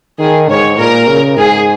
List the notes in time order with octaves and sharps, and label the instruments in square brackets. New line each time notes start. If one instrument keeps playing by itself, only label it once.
[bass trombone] D#3 [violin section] G#4
[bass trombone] G#2 [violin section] C#5
[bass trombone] A#2 [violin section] A#4
[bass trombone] C#3
[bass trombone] G#2 [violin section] G#4